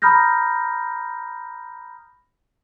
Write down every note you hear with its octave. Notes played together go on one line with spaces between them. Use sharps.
A#5 B5 D#6 F6 G6 A#6